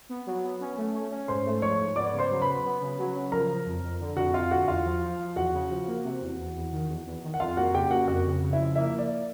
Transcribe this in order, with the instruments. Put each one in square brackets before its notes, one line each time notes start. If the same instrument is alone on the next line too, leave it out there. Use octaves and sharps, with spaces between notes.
[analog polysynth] B3
F#3
B3
C#4
A3
C#4
C#4
[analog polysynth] G#2 [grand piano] C5 C6
[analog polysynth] A3
[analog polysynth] F3 [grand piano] C#5 C#6
[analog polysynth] G#2
[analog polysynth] B3 [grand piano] D5 D6
[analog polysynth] C#3
[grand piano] C5 C6
[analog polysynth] F#3
[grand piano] B4 B5
[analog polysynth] F#3
B3
C#3
F#3
C#3
[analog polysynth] F3 [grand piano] A#4 A#5
[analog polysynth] F3
F2
F2
D3
[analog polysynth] F2 [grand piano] F#4 F#5
[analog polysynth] F2 [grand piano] F4 F5
[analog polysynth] D3 [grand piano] F#4 F#5
[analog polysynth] E2 [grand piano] F4 F5
[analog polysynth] F3
F3
F3
[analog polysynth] E2 [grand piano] F#4 F#5
[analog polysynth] C#3
F3
A#3
C3
E2
E2
E2
D#3
E2
E2
D#3
[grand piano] F#5
[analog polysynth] F2 [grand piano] F4 F5
[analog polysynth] A#3 [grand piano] F#4 F#5
[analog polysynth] C#3 [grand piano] G4 G5
[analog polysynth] A#3 [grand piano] F#4 F#5
[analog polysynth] F2 [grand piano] F#4 F#5
[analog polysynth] C#3
C#3
[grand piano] E4 E5
[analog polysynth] F3
[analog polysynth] A#3 [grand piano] E4 E5
[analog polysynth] A#3
[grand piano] D5